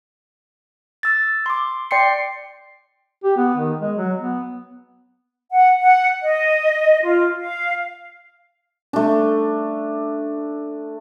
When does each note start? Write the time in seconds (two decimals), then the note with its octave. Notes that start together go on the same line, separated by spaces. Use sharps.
1.03 E6 A6
1.46 C6 D6
1.91 D5 G5 C6 C7 C#7
3.24 G4
3.37 B3
3.57 D#3
3.81 G#3
3.97 F#3
4.20 B3
5.52 F#5
5.79 F#5
6.21 D#5
7.02 F4
7.38 F5
8.93 A3 D4